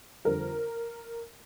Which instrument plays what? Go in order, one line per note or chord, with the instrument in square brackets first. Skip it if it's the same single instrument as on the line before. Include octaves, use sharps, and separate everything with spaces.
[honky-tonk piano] F2 D3 G3 A#4